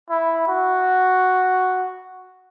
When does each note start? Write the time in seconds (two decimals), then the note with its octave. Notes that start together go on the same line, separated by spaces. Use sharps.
0.10 E4
0.48 F#4